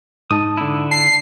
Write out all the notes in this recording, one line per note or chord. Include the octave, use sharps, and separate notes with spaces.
G#2 D#4 A5 D#6
D3 E4
A5 C7